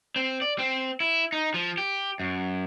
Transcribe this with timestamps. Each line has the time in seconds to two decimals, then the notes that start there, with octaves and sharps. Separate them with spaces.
0.16 C4
0.42 D5
0.59 C4
1.00 E4
1.32 D#4
1.54 F3
1.78 G4
2.20 F#2